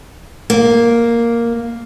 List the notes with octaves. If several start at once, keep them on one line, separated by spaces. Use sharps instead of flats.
A#3